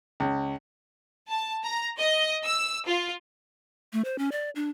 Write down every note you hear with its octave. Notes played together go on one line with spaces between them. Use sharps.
C#2
A5
A#5
D#5
E6
F4
A3
C5
C#4
D5
D4